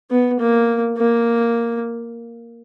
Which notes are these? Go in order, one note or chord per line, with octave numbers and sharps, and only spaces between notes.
B3
A#3
A#3